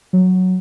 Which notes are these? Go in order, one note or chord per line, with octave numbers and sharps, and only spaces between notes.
F#3